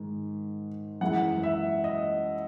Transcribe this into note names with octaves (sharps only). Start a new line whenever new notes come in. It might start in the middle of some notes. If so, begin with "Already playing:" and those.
Already playing: G#2 D#3 G#3
F#2 E3 G#3 F#5
E5
D#5